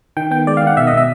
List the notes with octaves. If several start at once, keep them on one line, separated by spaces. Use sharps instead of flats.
D#3 G5
B3 G5
G#3 D5
F5
D#3 F#5
B2 E5
D#5
B2 E5